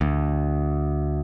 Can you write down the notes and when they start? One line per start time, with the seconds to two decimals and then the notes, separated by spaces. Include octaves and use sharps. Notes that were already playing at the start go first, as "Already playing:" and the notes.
0.01 D2